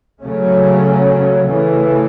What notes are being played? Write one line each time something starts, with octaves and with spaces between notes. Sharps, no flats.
C#3 F#3 A3 C#4
C#3 E3 A3